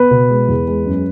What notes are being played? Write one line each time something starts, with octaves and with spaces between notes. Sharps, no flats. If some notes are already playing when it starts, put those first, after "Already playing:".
Already playing: B3 B4
B2
G#3
E2
G#3
F#2